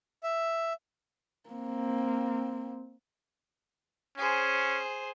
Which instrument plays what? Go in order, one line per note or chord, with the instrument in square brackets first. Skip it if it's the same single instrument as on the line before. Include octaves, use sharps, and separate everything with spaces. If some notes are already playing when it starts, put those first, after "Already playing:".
[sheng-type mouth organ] E5
[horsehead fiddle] A#3 C4
[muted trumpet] C#4 [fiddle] G#4 C5